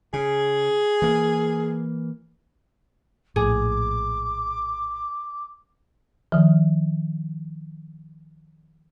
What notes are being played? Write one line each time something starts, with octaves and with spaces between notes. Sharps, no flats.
C#3 G#4
E3 A#3
A#1 A2 G#4 D6
D#3 F3